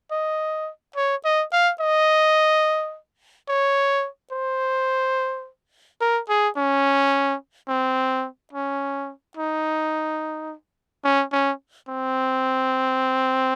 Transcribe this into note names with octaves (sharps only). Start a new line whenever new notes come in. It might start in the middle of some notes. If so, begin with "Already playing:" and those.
D#5
C#5
D#5
F5
D#5
C#5
C5
A#4
G#4
C#4
C4
C#4
D#4
C#4
C#4
C4